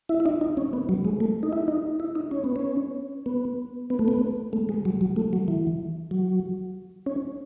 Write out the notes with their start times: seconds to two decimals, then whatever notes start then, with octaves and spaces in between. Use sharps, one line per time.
0.09 E4
0.20 E4
0.26 D#4
0.41 D#4
0.57 C#4
0.73 B3
0.89 F#3
1.05 G#3
1.20 A3
1.43 D#4
1.53 E4
1.68 D#4
2.00 E4
2.15 D#4
2.31 C#4
2.44 B3
2.56 C#4
3.26 B3
3.90 B3
3.99 A3
4.08 B3
4.53 A3
4.69 G#3
4.85 F#3
5.01 F#3
5.16 A3
5.33 F#3
5.48 E3
6.11 F#3
7.06 C#4